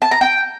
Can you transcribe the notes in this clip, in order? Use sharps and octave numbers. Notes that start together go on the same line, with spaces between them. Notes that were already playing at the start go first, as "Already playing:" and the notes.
A5
A#5
G5